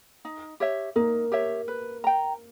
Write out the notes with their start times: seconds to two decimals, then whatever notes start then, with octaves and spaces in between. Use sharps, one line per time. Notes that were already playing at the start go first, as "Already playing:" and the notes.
0.25 D#4
0.60 G4 C#5 E5
0.96 A#3 D#4
1.32 G4 C#5 E5
1.68 B4
2.04 G5 A#5